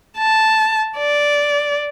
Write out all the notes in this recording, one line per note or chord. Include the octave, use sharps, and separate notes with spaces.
A5
D5